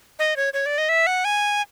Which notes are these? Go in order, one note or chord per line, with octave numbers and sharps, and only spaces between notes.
D#5
C#5
C#5
D5
D#5
E5
F#5
G#5